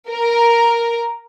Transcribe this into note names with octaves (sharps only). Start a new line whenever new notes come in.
A#4